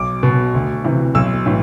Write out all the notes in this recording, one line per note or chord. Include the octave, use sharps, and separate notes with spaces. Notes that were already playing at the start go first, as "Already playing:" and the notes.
Already playing: B1 D6
B2
D2
C3 E3
B1 E6
A2 E3